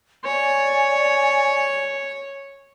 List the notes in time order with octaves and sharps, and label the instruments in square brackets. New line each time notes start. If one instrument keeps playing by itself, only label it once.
[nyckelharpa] C#5 [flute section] D5 G#5